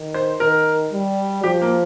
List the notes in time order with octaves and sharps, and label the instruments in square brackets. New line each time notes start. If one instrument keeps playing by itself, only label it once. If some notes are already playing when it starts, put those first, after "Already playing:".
Already playing: [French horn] D#3
[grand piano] C5
[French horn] D#3 [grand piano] A#4
[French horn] G3
[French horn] F3 [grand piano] G4
[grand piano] A#3